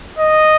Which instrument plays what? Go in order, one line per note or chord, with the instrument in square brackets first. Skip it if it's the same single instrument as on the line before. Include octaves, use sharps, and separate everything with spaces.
[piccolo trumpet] D#5